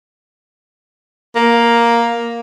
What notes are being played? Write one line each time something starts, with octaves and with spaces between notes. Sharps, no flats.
A#3